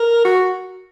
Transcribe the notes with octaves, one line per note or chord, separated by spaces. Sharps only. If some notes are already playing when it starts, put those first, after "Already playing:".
Already playing: A#4
F#4